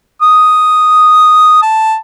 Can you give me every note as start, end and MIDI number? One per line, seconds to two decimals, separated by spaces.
0.22 1.59 87
1.63 1.95 81